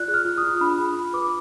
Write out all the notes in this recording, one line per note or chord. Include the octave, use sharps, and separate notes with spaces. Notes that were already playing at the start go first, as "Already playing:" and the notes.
Already playing: F4 D5 F#6
G#4
F6
F4
D#6
F4
D4 B5
G#4 B5
D4
B4 D6